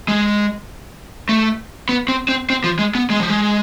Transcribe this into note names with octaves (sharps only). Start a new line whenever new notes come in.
G#3
A3
B3
C4
C4
C4
F3
G#3
B3
G#3
F3
G#3